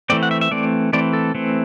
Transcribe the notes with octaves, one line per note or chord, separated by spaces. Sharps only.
E3 A3 C4 D5
F#5
E5
E5
E3 A3 C4 D5
E3 A3 C4 D5
A4
E3 A3 C4